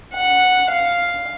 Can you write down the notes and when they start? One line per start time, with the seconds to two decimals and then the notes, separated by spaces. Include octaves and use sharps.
0.14 F#5
0.70 F5